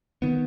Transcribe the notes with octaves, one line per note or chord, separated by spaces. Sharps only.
D#3 B3